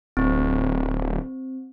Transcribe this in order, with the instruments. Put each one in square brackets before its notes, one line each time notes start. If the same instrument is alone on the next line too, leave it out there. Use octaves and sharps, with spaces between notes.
[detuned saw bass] D1 [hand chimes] C4